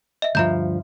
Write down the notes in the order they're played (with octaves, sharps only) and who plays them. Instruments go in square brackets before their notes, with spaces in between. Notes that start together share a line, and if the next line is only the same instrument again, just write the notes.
[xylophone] D#5 E5
[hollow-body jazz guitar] D2 G2 F3 [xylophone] E5 A#5 G6